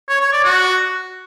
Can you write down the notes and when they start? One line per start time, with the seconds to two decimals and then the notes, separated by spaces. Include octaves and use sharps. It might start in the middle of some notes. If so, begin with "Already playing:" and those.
0.09 C#5
0.21 C#5
0.33 D5
0.44 F#4